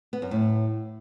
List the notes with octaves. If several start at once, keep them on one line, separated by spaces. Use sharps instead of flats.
B3
F#2
A2